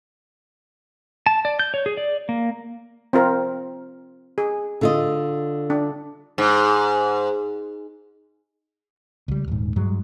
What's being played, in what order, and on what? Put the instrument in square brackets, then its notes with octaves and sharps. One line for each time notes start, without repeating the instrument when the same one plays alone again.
[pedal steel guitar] A5
D5
G6
C#5
G#4
D5
A#3
[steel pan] C4 F4 A#4
G#4
[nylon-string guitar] D3 F4 D#5
[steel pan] D4
[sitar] G#2
[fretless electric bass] C#2 G3
D#1 G#2
G2 F#3 G#3